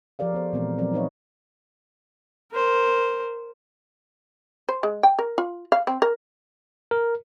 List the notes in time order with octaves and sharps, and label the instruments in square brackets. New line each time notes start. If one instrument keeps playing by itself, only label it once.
[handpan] F3 G4 A#4 D5 F5
B3 A4 C5
A#2 E3 G#3 B3 C4 A#4
F3 F#3 C4 A#4 D5
D#4 B4 C#5 D#5 F5
[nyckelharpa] A#4 C5
[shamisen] C5
G#3
G5
A#4
F4
F5
C4
A#4
[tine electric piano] A#4